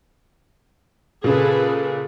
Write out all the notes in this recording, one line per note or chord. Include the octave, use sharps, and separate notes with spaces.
A#2 C#3 G#4 A4 B4